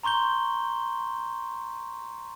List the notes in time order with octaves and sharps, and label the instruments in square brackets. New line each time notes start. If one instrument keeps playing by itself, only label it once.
[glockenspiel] A#5 C6 C#6 G6 G7